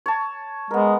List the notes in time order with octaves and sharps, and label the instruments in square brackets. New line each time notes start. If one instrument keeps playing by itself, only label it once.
[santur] C#5 A5
[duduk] G#3 [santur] B3 A#4